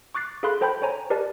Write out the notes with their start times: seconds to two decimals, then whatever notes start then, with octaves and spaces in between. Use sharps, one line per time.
0.14 C#6 D6 F#6 A6 C7
0.43 G#4 A4 F5 B5 C6 F#6
0.61 A4 C5 G5 A5 B5 G6
0.82 C5 C#5 G#5 A#5
1.10 G4 A#4 B4 D5 D#5 A5